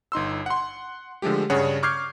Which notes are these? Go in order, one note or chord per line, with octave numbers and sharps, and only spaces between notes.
G1 D#4 C6 E6
F#5 C6
D3 F3 G#3 A3 G4
G2 C#3 D4 G#4 C#5 F#5
C#6 D6 F6 G6 G#6 C7